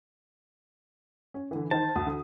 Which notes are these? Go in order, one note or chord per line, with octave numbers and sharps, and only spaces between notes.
C#4
D3 E3
D#3 C5 A5
D2 D#6
D3